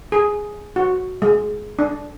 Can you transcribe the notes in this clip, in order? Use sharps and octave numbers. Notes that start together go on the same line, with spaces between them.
G#4
F#4
G#3
D4